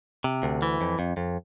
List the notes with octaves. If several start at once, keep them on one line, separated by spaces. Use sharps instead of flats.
C3
D2
E3
F2
F2
F2